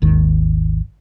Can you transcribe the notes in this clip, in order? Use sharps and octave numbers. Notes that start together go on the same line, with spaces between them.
G#1 D#2 D#3